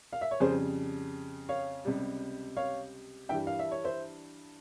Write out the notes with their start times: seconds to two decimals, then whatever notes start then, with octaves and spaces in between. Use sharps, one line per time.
0.13 F5
0.21 E5
0.31 C#5
0.40 F2 C#3 G3 G#4 C5
1.49 C#5 F5
1.85 C#2 C3 G3
2.57 C#5 F5
3.29 G2 E3 G3 E5 G5
3.47 F5
3.59 E5
3.71 C#5
3.84 C5 E5